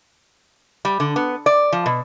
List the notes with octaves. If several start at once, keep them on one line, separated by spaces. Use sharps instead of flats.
G3
D3
B3
D5
F3
B2